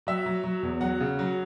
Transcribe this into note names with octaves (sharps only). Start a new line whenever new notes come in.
F#3 E5
F#3
F#3
E2
F#3 F#5
C#3
F#3